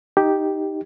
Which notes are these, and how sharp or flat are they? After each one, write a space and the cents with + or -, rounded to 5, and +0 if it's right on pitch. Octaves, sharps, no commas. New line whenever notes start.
D#4 +0 G4 +0